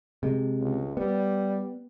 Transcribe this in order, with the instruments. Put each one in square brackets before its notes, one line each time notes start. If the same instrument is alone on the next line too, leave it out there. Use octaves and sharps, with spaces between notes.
[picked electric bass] C3 G#3
[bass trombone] C#2
[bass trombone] G3 [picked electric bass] B3